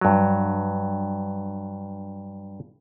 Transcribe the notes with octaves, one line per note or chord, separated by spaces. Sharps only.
G2 F#3